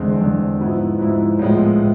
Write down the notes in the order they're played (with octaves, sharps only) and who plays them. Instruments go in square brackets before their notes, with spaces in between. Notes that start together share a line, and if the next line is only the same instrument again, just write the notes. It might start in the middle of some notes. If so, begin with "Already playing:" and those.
Already playing: [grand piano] E2 D3 G#3 C4
E2 D3 G#3 C4
G#2 F3 B3 E4
G#2 F3 B3 E4
A2 F3 G#3 B3
A2